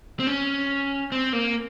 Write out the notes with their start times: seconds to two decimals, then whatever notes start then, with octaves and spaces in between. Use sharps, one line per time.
0.20 C4
0.27 C#4
1.12 C4
1.33 A#3